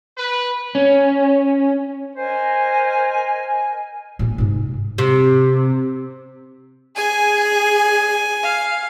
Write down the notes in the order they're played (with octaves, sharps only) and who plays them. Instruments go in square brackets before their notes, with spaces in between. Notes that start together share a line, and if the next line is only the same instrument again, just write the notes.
[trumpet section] B4
[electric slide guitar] C#4
[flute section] A#4 D#5 G#5 [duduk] C5
[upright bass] A2 A#3
G#2 C3
[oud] C3
[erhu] G#4 [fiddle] G#5
[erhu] F5